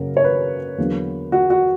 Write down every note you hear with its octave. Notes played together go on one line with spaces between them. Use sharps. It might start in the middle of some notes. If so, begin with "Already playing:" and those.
Already playing: F#2 C#3 F#3 A#3 A#4
C#5
B4
E2 D3 F#3 A#3
F#4
F#4